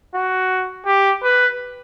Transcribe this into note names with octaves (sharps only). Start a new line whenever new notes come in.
F#4
G4
B4